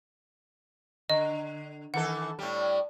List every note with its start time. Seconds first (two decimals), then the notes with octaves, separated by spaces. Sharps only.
1.10 D3 D#5
1.94 D#3 E3 A4 F#5
2.39 A2 G3